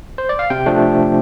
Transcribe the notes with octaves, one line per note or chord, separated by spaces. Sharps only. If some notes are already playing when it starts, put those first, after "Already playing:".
C5
D5
F5
C3 G5
F3 A3 D4